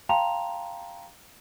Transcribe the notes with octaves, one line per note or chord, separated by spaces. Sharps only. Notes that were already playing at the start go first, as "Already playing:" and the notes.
F5 G5 A5 A#5 C6 F7